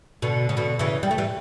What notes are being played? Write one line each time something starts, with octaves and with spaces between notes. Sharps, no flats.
B2 D3
C#3
B2 D3
C#3 E3
G3
A3
E3 G3